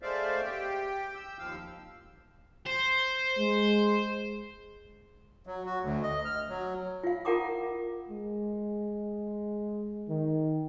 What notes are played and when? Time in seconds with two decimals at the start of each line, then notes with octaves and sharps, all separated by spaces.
0.02 G#3 A3 C5 D5 E5 F5
0.43 G4 G5
1.15 E6 G6
1.39 D#2 F3 F5 E6
2.66 C5
3.38 G#3
5.47 F#3
5.66 F#4
5.83 D2
6.03 D#5
6.25 F6
6.49 F#3
7.03 F4 F5
7.25 F4 A#4 F#5 A#5 D6 D#6
8.09 G#3
10.08 D#3